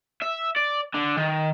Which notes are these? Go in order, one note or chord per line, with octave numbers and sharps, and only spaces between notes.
E5
D5
D3
D#3